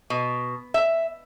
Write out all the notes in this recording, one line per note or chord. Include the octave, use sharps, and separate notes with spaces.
B2
E5